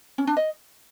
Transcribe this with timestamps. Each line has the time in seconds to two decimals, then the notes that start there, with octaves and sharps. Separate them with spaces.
0.18 C#4
0.27 D4
0.37 D#5